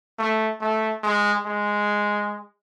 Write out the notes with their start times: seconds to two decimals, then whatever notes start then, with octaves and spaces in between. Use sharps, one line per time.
0.19 A3
0.61 A3
1.03 G#3
1.46 G#3